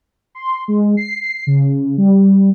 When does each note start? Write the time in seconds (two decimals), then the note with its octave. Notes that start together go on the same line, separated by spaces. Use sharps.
0.35 C6
0.68 G#3
0.97 C7
1.47 C#3
1.98 G3